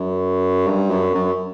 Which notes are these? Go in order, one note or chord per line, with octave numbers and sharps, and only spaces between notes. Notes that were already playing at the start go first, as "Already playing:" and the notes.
Already playing: F#2
G2
F#2
F#2